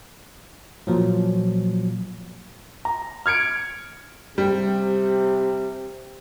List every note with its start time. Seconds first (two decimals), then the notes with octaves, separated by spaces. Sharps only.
0.87 A#2 F3 F#3
2.85 A#5
3.26 F6 G#6 C#7 D7
4.38 C3 G3